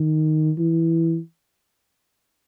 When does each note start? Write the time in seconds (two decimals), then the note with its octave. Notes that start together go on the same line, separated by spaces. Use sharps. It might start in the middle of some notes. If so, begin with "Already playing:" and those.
Already playing: D#3
0.58 E3